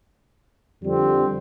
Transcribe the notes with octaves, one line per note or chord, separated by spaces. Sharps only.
F2 D3 G3 C4